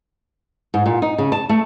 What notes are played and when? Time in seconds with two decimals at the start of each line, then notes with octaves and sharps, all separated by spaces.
0.74 G#2
0.86 A#2
1.02 D#4
1.18 C#3
1.32 A5
1.49 A3